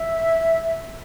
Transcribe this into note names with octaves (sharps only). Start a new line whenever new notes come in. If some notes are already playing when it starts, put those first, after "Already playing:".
Already playing: E5